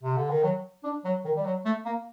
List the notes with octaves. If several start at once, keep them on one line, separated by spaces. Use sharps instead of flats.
C3
D3
D#3
F#3
D4
F#3
D#3
G3
F#3
A3
A#3